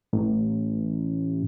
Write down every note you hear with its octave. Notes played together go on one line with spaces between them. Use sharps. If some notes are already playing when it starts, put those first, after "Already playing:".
A1